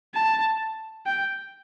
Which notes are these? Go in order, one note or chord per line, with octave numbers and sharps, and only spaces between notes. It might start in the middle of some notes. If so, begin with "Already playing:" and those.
A5
G5